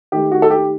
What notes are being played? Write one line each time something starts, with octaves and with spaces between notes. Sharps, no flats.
D#3 A3 G4
F#4
A4
G4